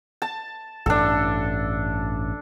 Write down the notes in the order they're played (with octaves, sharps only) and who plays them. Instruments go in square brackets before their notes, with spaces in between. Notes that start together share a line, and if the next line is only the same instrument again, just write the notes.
[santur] A5
[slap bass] A1 G2 [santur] D4 A4